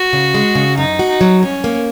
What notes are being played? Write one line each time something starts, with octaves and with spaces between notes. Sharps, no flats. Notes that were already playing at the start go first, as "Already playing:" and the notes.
Already playing: F#4
C#3
G#3
C#3
F#2 D#4
F#4
D#4
F#3
F#2 C#4
A#3